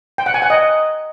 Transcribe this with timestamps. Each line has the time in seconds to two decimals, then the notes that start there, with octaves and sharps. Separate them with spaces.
0.18 G5
0.26 F#5
0.34 G#5
0.42 F#5
0.50 D#5